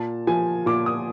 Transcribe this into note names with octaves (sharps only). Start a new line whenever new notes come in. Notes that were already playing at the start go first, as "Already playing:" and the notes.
Already playing: A#2 A5
F3 G#5
A#2 D6
D#6